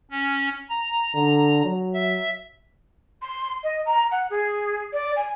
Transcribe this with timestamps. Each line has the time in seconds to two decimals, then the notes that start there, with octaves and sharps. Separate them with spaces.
0.11 C#4
0.69 A#5
1.15 D3
1.65 F#3
1.94 E5
3.22 C6
3.63 D#5
3.85 A#5
4.11 F#5
4.30 G#4
4.93 D5
5.16 G#5